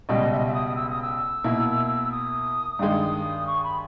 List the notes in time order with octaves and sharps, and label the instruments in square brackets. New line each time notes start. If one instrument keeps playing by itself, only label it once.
[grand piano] C#2 B2 G3 [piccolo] D#5
[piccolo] E5
D#5
E5
D#6
E6
D#6
E6
[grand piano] B2 A#3 E4
[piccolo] D#6
[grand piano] G2 D#3 G#3
[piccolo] C#6
B5